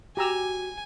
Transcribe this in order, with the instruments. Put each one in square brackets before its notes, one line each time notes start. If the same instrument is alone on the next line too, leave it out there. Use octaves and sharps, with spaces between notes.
[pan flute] F#4 [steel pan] G4 A#5 E6 [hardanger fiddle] G#5